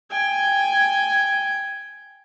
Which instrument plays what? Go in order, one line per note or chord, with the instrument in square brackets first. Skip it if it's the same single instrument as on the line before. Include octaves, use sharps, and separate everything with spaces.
[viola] G5 G#5